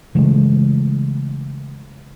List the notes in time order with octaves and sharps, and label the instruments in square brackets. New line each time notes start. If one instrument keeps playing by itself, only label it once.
[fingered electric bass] C#3 E3 G#3 A3